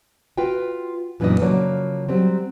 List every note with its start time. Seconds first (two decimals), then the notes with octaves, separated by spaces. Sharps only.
0.38 F4 F#4 B4 G5
1.20 F#2 A#2 E3 B3 D4 D#5
1.41 C#3 F3 F#3 A#3 C#5 D5
2.08 F#3 G3 C4